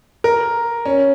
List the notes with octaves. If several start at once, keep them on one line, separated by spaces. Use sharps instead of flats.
A#4
C#4